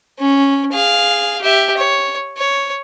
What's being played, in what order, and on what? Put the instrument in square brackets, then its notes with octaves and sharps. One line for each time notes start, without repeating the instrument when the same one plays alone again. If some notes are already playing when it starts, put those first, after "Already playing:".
[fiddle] C#4
G#4 F5
G4 E5
C#5
C#5